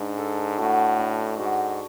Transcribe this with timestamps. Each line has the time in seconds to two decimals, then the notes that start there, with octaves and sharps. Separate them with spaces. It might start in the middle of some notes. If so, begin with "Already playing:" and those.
Already playing: G#2 D4
0.18 A4
0.58 A2 F#4
0.99 D4
1.39 G#2 F#4